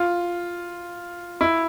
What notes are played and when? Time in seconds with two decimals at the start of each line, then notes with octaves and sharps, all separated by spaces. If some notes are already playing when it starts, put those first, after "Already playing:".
Already playing: F4
1.41 E4